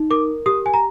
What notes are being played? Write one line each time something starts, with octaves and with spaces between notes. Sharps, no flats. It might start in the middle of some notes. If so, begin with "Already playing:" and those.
Already playing: D#4
A#4 D6
G4 D#6
G#5
A#5